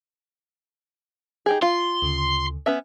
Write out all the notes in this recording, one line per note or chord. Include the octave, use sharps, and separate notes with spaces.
D#4 G4 G#4
F4 C6
D2 C#3
B3 C#4 E5